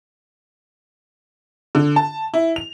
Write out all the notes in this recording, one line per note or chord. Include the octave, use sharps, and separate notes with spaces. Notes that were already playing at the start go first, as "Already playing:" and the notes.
D3
A5
E4
F7